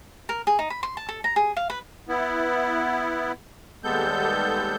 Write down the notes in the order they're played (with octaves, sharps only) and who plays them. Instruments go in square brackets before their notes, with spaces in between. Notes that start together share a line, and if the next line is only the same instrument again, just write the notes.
[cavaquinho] A#4
G#4
D#4
B5
C6
A5
A4
A#5
G#4
F5
B4
[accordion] B3 E4
D#2 G3 G#3 B3 A4 G6